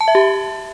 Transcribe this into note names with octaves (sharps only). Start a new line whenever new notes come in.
A5
E5
G4